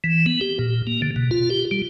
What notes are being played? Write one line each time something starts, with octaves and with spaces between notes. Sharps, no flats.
E3
B3
G4
A#2
A#3
D3
B2
F4
G4
G3